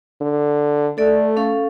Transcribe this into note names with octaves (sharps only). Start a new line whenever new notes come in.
D3
A3 A4 D5
C#4 A4 F5